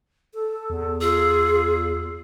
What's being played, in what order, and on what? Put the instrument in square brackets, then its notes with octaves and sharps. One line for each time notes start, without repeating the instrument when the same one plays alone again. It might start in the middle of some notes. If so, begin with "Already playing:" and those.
[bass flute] A4
[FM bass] E2
[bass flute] F4 [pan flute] G#4 [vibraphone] E6